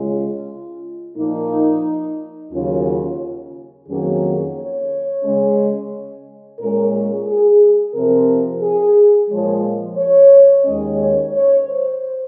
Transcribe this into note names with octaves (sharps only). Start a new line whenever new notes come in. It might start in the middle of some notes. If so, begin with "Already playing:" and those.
Already playing: C#3 G#3 C#4 F4
A#2 F3 A#3 D#4
D#2 C#3 F#3 C#4 F4
F2 D#3 F#3 A#3 C#4 G#4
C#5
C#3 G#3 C#4
A#2 G#3 C#4 A#4
G#4
G#4
C3 F3 C4 A#4
G#4
A#2 F3 G#3 C#5
C#5
D#2 D#3 G#3 C#4 D#5
C#5
C#5
C5